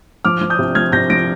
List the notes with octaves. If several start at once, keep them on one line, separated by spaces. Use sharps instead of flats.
F3 D6 F6
F3
D#6 G6
C3
F3 F6 G#6
C3 G6 A#6
F3 A#6 D7